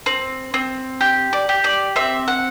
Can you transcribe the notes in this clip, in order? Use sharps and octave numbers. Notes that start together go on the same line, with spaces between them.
C4
C4
G4
D5
G4
D5
C4 E5
F#5